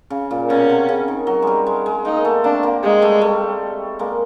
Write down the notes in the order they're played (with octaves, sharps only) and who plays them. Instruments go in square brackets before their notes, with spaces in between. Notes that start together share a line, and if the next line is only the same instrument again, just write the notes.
[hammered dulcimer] C#3
A#2
[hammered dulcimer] B2 [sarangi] C#4
[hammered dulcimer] C3
C#3
D#3
F#3
G3 G#3
G#3
G#3
[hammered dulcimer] G#3 A#3 [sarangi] D#4
[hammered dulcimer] A3 B3
[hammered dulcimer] A#3 C4 [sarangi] D4
[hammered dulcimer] A#3 C4
[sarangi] G#3
[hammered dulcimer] G3 A3
G3 A3
G#3 A#3